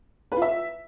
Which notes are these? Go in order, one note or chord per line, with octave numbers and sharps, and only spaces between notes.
B4
F4
E5